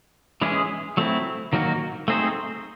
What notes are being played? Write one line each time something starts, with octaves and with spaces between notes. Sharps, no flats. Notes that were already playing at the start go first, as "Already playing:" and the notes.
E3 G#3 C#4 E4 G#4
F#3 A3 C4 E4
D#3 F#3 A#3 D#4 F#4
A3 C4 D#4 G#4 C5